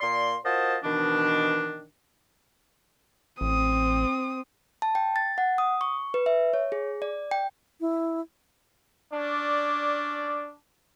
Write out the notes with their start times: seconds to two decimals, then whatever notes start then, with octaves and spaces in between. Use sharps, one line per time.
0.01 A#2 A#3 D5 C6
0.45 F4 F#4 A#4 C5 D#5 A5
0.84 B2 D#3 E3 D4
3.41 A1 C4 D#6
4.82 A5
4.95 G5
5.16 A6
5.38 F#5
5.58 D#6
5.81 C#6
6.14 B4
6.26 E5
6.53 C#5
6.72 G#4
7.02 D5
7.31 G5
7.81 E4
9.13 C#4 D4 D5